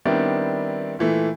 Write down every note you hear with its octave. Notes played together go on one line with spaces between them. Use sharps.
D#3 G3 B3 C4 D4 E4
A#2 E3 A3